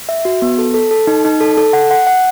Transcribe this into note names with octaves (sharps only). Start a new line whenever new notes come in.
E5
F#4
B3
A4
A4
A4
D#4
D#4
A4
A4
F#5
F#5
F#5